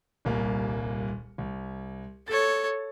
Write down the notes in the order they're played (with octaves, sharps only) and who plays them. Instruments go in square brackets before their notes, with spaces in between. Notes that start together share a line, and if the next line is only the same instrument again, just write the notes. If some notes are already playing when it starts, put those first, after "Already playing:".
[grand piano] D#1 C2 A#3
C2
[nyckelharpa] A4 C#5 [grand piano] A6